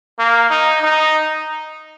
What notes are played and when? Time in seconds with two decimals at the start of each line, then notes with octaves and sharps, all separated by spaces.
0.19 A#3
0.50 D#4
0.83 D#4